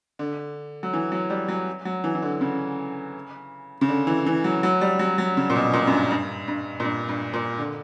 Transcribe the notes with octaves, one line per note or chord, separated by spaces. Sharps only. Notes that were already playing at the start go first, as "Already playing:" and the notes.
D3
F#3
E3
F#3
G3
F#3
F#3
E3
E3
D3
C#3
C#3
D3
E3
E3
F#3
F#3
G3
F#3
F#3
C#3
A#2
B2
A#2
F#2
G2
G2
G2
A#2
G2
G2
A#2
D3